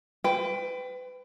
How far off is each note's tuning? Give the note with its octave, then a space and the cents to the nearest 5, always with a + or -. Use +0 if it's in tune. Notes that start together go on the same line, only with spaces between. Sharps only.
B4 +30 G5 -5